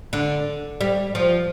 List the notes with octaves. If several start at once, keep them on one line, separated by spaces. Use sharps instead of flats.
D3
G3
F3